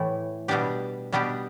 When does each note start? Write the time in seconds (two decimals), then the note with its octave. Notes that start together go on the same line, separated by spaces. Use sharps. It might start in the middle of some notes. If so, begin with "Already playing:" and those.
Already playing: A2 E3 A3 E4
0.48 B2 G3 B3 D4 G4
1.12 B2 G3 B3 D4 G4